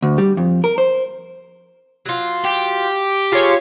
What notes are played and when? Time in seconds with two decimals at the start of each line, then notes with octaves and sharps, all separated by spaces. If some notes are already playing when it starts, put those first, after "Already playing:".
0.02 D2
0.18 G3
0.37 F2
0.64 A#4
0.78 C5
2.06 F#3 F4
2.44 G4
3.32 F4 G#4 A#4 C#5